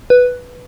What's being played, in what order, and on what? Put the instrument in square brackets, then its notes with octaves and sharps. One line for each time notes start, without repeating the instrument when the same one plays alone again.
[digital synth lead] B4